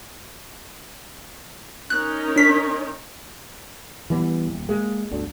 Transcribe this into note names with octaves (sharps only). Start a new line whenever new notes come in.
C#4 D#4 A#4 F#6
D4 B6
E3 G3 B3
D#1
G#3 A#3
G1 D2 D3